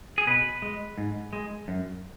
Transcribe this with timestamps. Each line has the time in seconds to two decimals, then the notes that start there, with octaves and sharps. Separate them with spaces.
0.18 G#4
0.27 B2 B4
0.62 G#3
0.98 G#2
1.33 G#3
1.68 F#2